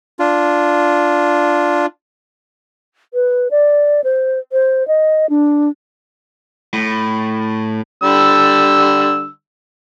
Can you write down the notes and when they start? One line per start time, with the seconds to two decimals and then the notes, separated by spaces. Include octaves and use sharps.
0.19 D4 F4
3.14 B4
3.51 D5
4.04 C5
4.52 C5
4.88 D#5
5.30 D4
6.73 A2
8.03 D3 G3 E6